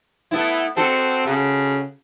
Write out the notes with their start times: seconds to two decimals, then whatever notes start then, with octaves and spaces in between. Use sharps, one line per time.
0.31 A3 B3 E4
0.77 C4 F#4 A4
1.26 C#3